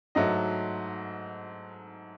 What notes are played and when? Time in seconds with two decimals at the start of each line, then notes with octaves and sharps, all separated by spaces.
0.15 G#2 F#3 A3 D#5